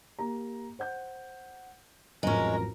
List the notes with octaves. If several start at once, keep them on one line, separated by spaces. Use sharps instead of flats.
A#3 G4 A#5
C5 F#5 G6
A1 F2 F#3 G#3 C#4 A#4 A#5